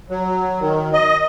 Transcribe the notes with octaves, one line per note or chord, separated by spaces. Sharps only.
F#3
D#3
D#5